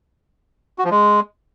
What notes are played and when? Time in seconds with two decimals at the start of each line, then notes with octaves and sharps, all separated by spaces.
0.78 F#4
0.85 F3
0.91 G#3